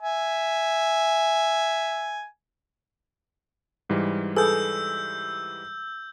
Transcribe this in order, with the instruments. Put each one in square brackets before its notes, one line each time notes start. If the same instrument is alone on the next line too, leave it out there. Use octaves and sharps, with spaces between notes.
[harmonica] E5 G#5
[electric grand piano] G#2 E3 G3
[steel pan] G#4 A4 B4 [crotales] E6 G6